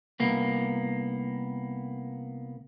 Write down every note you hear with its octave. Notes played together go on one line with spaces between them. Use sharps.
C2 A#3 B3